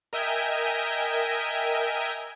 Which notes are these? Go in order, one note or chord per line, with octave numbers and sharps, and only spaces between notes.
A#4 D#5 E5 G5 G#5